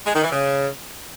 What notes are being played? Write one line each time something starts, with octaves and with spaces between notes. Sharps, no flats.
G#3
D#3
E3
C#3